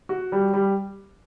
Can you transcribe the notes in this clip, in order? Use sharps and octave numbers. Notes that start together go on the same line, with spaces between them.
F#4
G3
G3